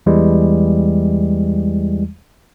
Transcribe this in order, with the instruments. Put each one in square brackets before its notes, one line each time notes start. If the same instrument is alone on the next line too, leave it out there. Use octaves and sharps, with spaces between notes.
[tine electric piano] E2 E3 G3 G#3